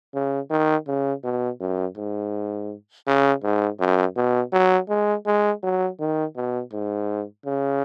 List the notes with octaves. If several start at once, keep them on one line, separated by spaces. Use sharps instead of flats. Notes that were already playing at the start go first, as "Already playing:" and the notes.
C#3
D#3
C#3
B2
F#2
G#2
C#3
G#2
F#2
B2
F#3
G#3
G#3
F#3
D#3
B2
G#2
C#3